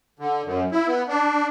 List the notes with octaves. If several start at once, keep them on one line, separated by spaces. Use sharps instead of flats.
D3
F#2
E4
B3
D4